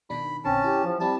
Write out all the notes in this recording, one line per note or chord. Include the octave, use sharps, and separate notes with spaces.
B2 D#3 D4 B5
A#1 D3 C4 C#4 A5
E4 G4
F3
G3 C4 E4 G4 A5